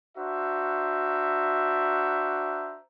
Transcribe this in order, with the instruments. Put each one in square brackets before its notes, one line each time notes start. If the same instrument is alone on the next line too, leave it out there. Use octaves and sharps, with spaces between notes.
[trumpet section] D4 F#4 C5 E5 A#5